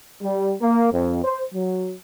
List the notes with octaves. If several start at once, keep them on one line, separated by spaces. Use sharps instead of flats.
G3
A#3
F2
C5
F#3